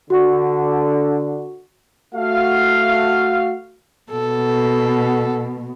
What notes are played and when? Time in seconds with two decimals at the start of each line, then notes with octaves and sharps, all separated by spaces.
0.10 D3 F#4 F#5 C#6
2.14 A3 F#4 F5
4.11 B2 A4